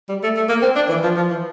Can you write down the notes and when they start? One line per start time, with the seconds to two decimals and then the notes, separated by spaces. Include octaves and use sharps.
0.09 G3
0.23 A3
0.36 A3
0.49 A#3
0.62 C4
0.76 D4
0.89 E3
1.03 F3
1.16 F3
1.30 E3